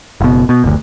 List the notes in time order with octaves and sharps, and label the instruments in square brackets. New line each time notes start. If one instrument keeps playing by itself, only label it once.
[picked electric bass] F#1 B2
B2
F#1 D2